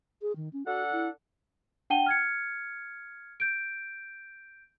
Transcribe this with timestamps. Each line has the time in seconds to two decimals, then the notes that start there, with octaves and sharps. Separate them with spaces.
0.22 G#4
0.36 D#3
0.53 C#4
0.66 D4 F#4 A4 F#5
0.92 E4
1.90 D4 F#5 G5 A5 D#7 G7
2.06 F6 G#6 C#7
3.40 G6 D7